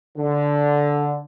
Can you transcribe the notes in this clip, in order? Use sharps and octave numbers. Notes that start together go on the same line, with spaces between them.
D3